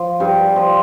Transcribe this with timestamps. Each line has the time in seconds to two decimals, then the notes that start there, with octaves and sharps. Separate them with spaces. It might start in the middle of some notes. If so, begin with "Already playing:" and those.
Already playing: F3
0.20 G2
0.56 F3